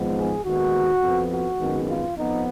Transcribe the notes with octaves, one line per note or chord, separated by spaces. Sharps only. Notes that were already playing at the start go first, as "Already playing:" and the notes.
Already playing: G#1 G#2 F3 G#3 B3
G#4
D#2 D#3 G#3 B3 F#4
F2 F3 B3
F#4
G#1 F#2 D#3 G#3 B3
F4
F2 F3 B3 D#4